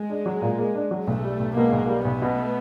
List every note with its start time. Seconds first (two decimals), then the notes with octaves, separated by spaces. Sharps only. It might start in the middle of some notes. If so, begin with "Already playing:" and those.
Already playing: G#3
0.10 D4
0.26 F#3
0.42 A#2
0.58 A#3
0.75 D4
0.91 F#3
1.07 B1 A3
1.24 G3
1.39 B1
1.56 B2 G#3 A#3
1.72 B1
1.88 G3
2.05 B1 A3 B3
2.22 B2